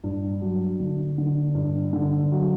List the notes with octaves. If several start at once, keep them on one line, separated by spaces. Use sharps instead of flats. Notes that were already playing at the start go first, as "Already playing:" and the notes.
G2
F#3
D3
D3
G2
D3
F#3